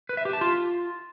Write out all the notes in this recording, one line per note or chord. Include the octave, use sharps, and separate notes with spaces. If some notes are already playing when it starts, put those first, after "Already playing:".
B4
E5
G4
A5
F4